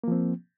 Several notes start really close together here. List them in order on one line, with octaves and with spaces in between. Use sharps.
A#3 F3 C4